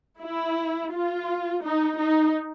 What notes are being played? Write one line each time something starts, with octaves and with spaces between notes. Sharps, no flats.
E4
F4
D#4
D#4